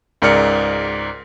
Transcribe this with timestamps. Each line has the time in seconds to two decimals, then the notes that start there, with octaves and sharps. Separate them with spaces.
0.22 C#2 G#2 A#4 D5 F6 C#7